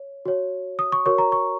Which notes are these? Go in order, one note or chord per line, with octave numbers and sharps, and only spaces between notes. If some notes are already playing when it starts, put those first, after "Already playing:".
Already playing: C#5
F#4 C#5
D#6
C#6
F#4 A#4 C#5 C#6
A#5
C#6